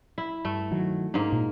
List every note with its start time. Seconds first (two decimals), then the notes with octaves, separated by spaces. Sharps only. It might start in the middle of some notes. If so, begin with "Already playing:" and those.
0.18 E4
0.45 G2 A3
0.71 D#3 F#3
1.14 G#2 A#3 D4
1.32 A#2